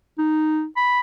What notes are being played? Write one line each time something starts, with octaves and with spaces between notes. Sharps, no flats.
D#4
B5